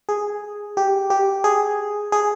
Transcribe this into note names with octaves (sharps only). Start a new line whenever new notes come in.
G#4
G4
G4
G#4
G#4